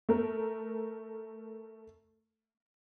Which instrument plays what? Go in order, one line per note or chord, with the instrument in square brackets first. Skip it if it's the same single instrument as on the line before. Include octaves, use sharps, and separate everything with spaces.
[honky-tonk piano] A3 A#4